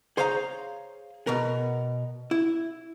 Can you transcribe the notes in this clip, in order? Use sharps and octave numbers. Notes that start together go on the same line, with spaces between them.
G#4 C5 C#5 F5 A5 A#5
B2 B3 A#4
E4